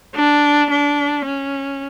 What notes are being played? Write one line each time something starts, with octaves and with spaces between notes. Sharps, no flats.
D4
D4
C#4